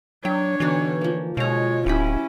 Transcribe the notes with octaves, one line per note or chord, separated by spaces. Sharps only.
F#3 D4 C#5 G5
B2 D3 E3 D#4
F3 A#3
B2 G#3 F4 C#5 A#5
D1 F#3 C#4 E4 G4 B5